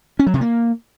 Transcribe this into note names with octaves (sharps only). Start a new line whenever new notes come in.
C#4
F#3
C3
A#3